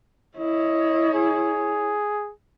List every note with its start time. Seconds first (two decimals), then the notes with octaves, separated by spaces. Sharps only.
0.37 E4 C#5 D#5
1.14 G#4